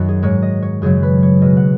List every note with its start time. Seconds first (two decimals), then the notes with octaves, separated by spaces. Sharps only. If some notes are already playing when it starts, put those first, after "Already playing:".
Already playing: F#2 D#3 F#4 D#5
0.09 G#4
0.23 G#2 G#3 C#5
0.42 D#5
0.62 C#5
0.82 F#2 C#3 F#3 G#4
1.03 B4
1.23 C#5
1.42 B2 G#3 D#5
1.57 F#5